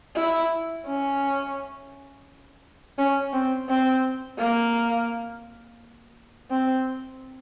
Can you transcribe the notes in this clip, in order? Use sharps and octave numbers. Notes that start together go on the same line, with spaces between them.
E4
C#4
C#4
C4
C4
A#3
C4